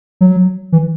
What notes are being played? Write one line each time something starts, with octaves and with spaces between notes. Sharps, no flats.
F#3
E3